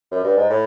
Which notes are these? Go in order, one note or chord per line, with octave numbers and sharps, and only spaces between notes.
F#2
G2
G#2
A2